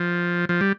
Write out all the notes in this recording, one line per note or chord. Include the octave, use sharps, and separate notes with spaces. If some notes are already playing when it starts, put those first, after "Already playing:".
Already playing: F3
F3
G3